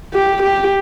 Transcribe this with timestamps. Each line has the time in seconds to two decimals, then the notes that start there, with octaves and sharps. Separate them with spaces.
0.14 G4
0.43 G4